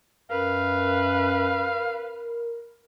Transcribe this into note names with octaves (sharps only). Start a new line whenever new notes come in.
F#2 A#4 B4 F5